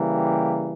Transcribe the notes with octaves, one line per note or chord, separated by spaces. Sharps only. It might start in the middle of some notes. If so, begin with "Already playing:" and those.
Already playing: C#3 E3 G3 A#3
G4